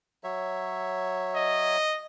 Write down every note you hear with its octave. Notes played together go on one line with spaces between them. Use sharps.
F#3 C#5 E5
D#5